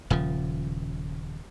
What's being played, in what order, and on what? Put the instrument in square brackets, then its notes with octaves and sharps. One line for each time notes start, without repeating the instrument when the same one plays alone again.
[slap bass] D#1 C#3 F3